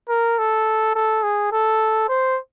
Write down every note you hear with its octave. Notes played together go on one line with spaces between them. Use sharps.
A#4
A4
A4
G#4
A4
C5